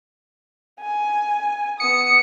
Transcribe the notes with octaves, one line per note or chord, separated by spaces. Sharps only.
G#5
B3 D#6 C#7